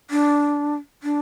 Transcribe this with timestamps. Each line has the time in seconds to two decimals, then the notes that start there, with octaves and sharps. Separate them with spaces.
0.10 D4
1.03 D4